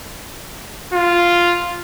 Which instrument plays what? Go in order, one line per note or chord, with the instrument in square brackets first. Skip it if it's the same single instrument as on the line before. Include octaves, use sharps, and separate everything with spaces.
[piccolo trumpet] F4